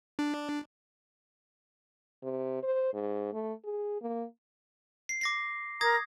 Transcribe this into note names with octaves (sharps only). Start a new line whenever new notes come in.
D4
C3
C5
G#2
A3
G#4
A#3
C7
D6 A#6 C7
A#4 A#5 D#6 G#6 A#6